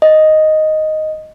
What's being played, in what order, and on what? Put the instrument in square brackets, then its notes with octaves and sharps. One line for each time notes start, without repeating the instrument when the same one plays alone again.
[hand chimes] D#5